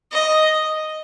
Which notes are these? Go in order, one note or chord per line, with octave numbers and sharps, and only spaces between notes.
D#5